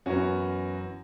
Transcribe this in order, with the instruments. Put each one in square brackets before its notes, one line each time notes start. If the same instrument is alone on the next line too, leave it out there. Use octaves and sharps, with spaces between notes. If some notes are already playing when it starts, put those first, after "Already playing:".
[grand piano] F#2 E3 B3 C#4 F#4